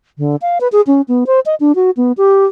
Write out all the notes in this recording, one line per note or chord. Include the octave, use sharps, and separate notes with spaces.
D3
F5
B4
G#4
C#4
B3
C5
D#5
D4
F#4
B3
G4